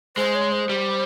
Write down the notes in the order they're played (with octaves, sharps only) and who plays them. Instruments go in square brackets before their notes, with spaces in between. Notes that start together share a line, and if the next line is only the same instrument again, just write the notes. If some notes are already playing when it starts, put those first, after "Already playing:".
[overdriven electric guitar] G#3 [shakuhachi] C5
[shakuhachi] C#5
C5
[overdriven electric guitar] G3